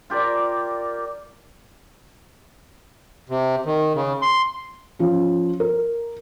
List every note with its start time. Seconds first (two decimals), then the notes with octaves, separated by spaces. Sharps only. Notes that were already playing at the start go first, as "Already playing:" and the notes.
0.10 F4 G4 A#4 D5
3.30 C3
3.65 D#3
3.95 C#3
4.22 C6
4.99 F3 C#4
5.60 A#4